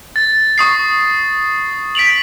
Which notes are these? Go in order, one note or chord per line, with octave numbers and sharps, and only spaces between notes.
A6
C#6 D#6 C7
B6 D7 F7 F#7